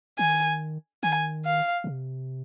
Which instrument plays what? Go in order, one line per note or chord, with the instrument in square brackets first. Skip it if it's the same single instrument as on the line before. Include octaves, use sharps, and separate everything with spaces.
[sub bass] D#3 [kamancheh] G#5
[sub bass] D#3 [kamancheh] G#5
[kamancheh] F5
[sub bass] A#2
C3